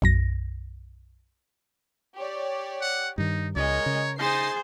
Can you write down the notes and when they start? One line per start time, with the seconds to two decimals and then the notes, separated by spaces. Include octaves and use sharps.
0.02 B1 F#2 A#6
2.16 G4 C#5 D5
2.81 F#5
3.18 G2 D#3 D#4
3.56 C#2 G#3 A#4 C#5 D#5
3.86 C#3
4.19 D#4 G#4 C5 D#6 A6 C7